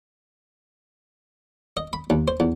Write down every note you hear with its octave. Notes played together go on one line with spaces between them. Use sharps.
D#5
B5
D#2
C5
E2